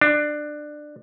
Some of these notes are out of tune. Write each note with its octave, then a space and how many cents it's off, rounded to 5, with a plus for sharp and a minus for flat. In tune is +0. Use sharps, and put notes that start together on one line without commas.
D4 +20